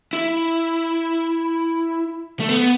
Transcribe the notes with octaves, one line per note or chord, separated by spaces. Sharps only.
E4
A3
B3